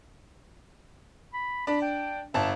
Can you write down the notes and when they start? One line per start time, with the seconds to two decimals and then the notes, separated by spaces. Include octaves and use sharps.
1.33 B5
1.67 D4 B5
1.82 G5
2.34 G1 E5 A5